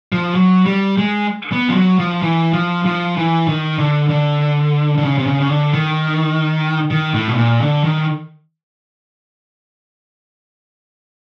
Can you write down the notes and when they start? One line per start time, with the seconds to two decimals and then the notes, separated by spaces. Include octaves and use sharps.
0.12 F3
0.35 F#3
0.66 G3
0.98 G#3
1.52 B3
1.69 F3
1.75 F#3
1.99 F3
2.22 E3
2.53 F3
2.85 F3
3.17 E3
3.48 D#3
3.78 D3
4.09 D3
4.98 D3
5.04 C#3
5.18 C3
5.26 C#3
5.41 C#3
5.50 D3
5.73 D#3
6.91 D#3
7.14 A2
7.28 B2
7.38 A#2
7.61 D3
7.84 D#3